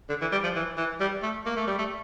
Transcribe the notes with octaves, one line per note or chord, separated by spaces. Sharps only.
D3
E3
G3
F3
E3
E3
G3
A3
A#3
A3
G3
A3